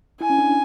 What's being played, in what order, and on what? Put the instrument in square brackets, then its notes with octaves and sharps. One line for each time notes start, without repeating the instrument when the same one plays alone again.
[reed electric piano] E4 [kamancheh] G#5
[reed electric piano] C#4
D4